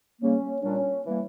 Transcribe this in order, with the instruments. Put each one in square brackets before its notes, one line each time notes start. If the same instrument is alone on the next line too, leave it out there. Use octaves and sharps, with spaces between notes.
[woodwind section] C#3 G3 A#3 [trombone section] C#4
[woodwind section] A#2 G3 D4 [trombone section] C#4
[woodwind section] E3 G3 A#3